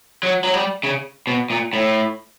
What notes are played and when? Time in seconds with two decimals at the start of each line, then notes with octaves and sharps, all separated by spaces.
0.23 F#3
0.44 F#3
0.54 G3
0.83 C#3
1.27 B2
1.50 A#2
1.73 A2